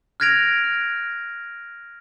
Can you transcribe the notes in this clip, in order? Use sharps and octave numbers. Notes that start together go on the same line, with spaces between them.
F6 F#6 G#6 A#6 D7 F7